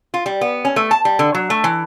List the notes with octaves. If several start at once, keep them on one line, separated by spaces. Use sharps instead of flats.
F4
G3
B3
C#4
A3
A5
G3
D3
F#3
A3
E3